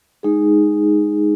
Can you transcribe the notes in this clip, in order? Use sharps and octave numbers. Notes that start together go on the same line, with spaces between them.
G#3 D#4 G#4